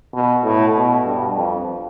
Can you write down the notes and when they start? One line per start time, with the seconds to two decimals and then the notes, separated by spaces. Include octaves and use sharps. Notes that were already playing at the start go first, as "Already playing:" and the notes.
0.14 B2
0.44 A2
0.75 B2
1.06 G2
1.37 F2